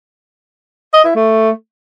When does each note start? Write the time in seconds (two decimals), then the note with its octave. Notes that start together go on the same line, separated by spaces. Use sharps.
0.94 D#5
1.05 E4
1.16 A3